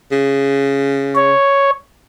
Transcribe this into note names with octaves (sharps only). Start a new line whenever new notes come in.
C#3
C#5